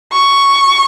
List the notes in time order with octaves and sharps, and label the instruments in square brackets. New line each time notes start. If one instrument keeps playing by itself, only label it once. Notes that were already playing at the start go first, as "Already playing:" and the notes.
[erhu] C#6